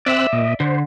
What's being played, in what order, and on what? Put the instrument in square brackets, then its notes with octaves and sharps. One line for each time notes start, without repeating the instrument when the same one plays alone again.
[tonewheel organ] C4 E6 F#6 [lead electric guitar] D5 E5
[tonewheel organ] A#2 D#5
[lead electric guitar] D3 [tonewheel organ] C5